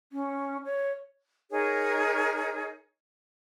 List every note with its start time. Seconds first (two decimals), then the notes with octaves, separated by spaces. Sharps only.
0.12 C#4
0.65 C#5
1.51 D#4 G#4 A#4 C#5